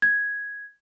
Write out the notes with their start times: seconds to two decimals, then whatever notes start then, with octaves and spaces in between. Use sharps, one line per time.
0.02 G#6